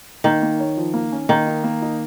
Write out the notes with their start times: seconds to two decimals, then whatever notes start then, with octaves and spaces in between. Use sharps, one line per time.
0.24 D#3 A#3
0.42 A#3
0.60 C#5
0.77 F3
0.94 A#3
1.12 C#4
1.29 D#3 A#3
1.47 D#4
1.64 A#3
1.82 D#4